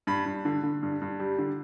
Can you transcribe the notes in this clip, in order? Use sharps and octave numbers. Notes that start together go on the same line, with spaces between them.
G2 B5
G2
D3
D3
G2
G2
G3
D3